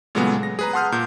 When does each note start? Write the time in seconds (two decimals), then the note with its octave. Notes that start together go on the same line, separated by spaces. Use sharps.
0.15 A#2 C#3 F#3 G#3 A3 B3
0.43 A#6
0.59 G#4 B4 A#5
0.73 F#5 A5 C6 D#6 F6 G6
0.92 A#2 G6